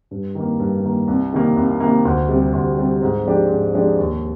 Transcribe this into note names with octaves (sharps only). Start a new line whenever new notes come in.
G2
D#3 A#3
G2
D#3 A#3
C2
C3 D#3 A#3
C2
C3 D#3 A#3
D2
C3 G3
D2
C3 G3
G#2
F3 G#3 D4 G4
G#2
F3 G#3 D4 G4
D#2